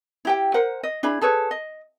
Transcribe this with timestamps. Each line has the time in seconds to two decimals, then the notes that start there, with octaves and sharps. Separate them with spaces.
0.25 E4 G4 G5
0.54 A#4 C5 F#5
0.83 D#5
1.03 D4 E4 G#4 B5
1.21 G#4 A4 B4 C#5
1.51 D#5